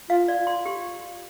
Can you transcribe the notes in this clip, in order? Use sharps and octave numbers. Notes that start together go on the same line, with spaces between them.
F4 F5
D5
C6
G4